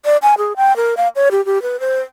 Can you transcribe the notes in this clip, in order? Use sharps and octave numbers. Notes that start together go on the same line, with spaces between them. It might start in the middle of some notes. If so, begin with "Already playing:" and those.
D5
G#5
G#4
G5
A#4
F5
C#5
G4
G4
B4
C5